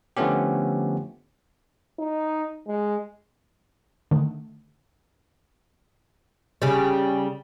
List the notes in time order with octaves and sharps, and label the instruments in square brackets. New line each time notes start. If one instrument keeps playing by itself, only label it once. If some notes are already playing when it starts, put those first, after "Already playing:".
[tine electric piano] D3 F3 A3 B3 C#4 G4
[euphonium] D#4
G#3
[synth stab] D3 D#3 A3
[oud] C#3 G3